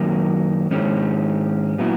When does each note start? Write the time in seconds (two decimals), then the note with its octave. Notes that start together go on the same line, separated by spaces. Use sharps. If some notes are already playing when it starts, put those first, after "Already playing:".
Already playing: F#2 D#3 F#3 A#3
0.71 G#2 D#3 G#3 C#4
1.78 A#2 F#3 B3 E4